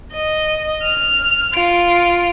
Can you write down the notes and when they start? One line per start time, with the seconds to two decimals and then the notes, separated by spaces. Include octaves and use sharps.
0.14 D#5
0.84 F6
1.54 F4 D7